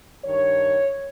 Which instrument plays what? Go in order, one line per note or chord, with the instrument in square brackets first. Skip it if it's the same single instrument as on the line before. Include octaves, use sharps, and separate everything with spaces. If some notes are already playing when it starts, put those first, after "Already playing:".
[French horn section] G2 D#3 C#5